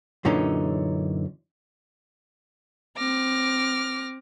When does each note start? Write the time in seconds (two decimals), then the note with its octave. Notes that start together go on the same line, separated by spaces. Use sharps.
0.25 F#2 A#2 D3 E3 C#4 D#4
2.97 C4 D6 F6 A#6